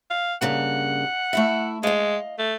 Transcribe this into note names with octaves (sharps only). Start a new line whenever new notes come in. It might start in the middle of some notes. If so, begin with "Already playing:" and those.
F5
G2 C#3 A#3 F#5
A3 E4 E5
G#3 D#5 F5
A3